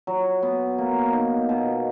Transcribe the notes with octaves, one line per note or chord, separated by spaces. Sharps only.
F#3
B3
A#3
D#4
B2